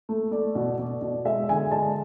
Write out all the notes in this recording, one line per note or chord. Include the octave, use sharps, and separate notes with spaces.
A3
A3 D5
B2
B2 D5
B2
G#3 E5
D3 G#5
G#3 A5